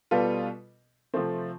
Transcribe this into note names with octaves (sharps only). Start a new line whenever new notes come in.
B2 G3 B3 F4 A4
C3 F3 A3 C4